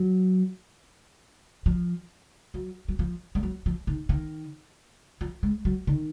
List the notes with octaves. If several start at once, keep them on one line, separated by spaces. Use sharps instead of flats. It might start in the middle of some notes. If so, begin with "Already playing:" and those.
Already playing: F#3
F3
F#3
F#3
F3
G#3
F#3
F3
D#3
D#3
F3
G#3
F#3
D#3